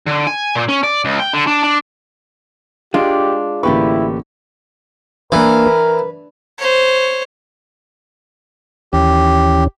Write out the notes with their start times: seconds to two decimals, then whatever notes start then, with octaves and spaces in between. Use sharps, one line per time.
0.06 D3
0.27 G#5
0.56 A#2
0.69 C#4
0.83 D5
1.05 C#2
1.20 G5
1.33 D3
1.47 D4
1.63 D4
2.94 G#3 D4 F4 G4
3.63 A1 D3 A#3 E4 G4 B4 C#6
5.32 E3 A#3 D4 A#4
5.67 B4
6.58 C5 C#5
8.93 D#2 E3 C#4 G4